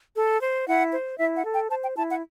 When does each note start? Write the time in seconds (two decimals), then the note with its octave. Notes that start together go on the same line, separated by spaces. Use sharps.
0.15 A4
0.41 C5
0.67 E4 F#5
0.93 C5
1.18 E4 E5
1.36 F#5
1.44 A4
1.53 G5
1.70 C5 A5
1.83 G5
1.96 E4 A5
2.09 F#5